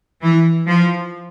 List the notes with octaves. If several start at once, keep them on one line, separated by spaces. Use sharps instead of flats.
E3
F3